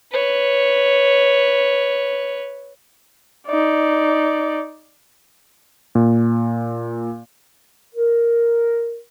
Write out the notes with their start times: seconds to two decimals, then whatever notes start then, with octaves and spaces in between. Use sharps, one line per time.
0.12 B4 C#5
3.47 D#4 D5
5.95 A#2
7.95 A#4